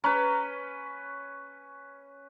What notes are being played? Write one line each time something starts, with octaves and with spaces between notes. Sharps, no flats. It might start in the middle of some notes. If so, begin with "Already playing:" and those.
C#4 B4 A#5